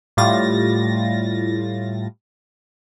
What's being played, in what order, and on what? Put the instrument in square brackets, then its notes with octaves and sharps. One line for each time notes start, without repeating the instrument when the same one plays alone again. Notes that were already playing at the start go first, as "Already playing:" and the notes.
[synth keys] A2 G3 F4 A6 A#6